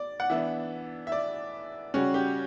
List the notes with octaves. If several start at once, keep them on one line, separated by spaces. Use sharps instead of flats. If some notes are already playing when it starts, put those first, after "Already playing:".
Already playing: D5
F#5
E3 B3 D4 E5
E5
D5
C#3 G3 C#4 F#4
G4